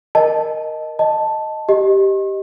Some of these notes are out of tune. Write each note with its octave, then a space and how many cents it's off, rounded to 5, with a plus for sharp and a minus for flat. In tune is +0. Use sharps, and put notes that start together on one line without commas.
A#4 +0 D#5 +0 A5 -10
D#5 +0 A5 +0
G4 -5 D#5 +0